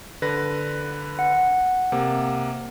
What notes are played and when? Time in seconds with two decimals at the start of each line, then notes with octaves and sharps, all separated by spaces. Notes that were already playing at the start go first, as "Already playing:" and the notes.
0.22 D3 B4 A#6
1.19 F#5
1.92 C3 A#3